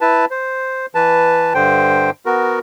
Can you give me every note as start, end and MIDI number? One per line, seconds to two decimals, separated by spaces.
0.01 0.25 64
0.01 0.25 71
0.01 0.25 81
0.31 0.86 72
0.95 1.53 52
0.95 1.53 71
0.95 1.53 81
1.54 2.10 43
1.54 2.10 50
1.54 2.10 72
1.54 2.10 79
2.26 2.59 59
2.26 2.59 66
2.26 2.59 70